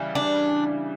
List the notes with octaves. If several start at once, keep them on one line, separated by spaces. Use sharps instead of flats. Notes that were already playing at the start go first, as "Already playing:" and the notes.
Already playing: C#3 E3 G3
D4